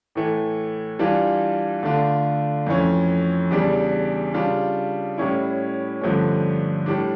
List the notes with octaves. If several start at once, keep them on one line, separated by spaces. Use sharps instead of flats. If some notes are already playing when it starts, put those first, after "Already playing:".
A2 E3 A3
E3 G3 D4 F4
D3 A3 D4 F4
F2 E3 A3 C#4
E2 C#3 G3 D4
C#3 G3 D4 F4
A2 G3 C#4 E4
G2 D3 F3 A3 C#4
A2 G3 D4